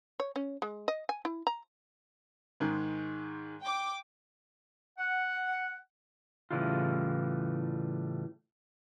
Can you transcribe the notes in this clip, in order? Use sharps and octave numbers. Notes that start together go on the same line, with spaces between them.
C#5
C#4
G#3
D#5
G#5
E4
A#5
G#2 D#3 G#3
G5 D6
F#5
A2 C#3 E3 G3 A3 F4